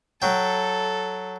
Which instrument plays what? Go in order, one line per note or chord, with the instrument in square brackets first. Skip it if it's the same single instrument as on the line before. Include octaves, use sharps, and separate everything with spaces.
[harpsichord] F#3 G5 [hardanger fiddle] A4